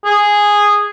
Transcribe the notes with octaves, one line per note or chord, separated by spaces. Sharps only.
G#4